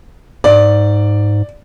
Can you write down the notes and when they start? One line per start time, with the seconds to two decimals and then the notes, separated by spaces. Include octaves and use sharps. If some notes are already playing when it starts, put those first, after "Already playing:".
0.44 G#2 D5